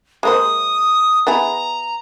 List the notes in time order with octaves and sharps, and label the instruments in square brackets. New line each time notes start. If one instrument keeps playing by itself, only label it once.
[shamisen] G#3 A#3 C5 [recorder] D#6
[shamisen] B3 E4 G#4 [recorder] A#5